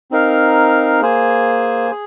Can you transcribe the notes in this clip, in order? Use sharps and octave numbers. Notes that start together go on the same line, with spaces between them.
C4 D#4 A#4 F5
A#3 G#4 C5 G#5
G#4